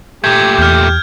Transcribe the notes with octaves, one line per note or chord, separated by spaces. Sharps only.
A#2 A3 G4 G6 G#6
E2 F6 G6